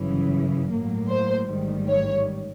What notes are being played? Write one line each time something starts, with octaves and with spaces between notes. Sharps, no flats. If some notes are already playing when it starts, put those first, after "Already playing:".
Already playing: G1 F#2 C#3 E3
A2 F#3 A#3
C5
A1 G#2 D#3 G3
C#5